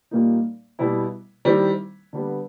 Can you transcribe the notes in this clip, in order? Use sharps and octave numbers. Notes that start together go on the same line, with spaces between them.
A#2 G3 A#3 D#4
B2 G3 B3 E4
D#3 G3 C4 E4
D3 G3 B3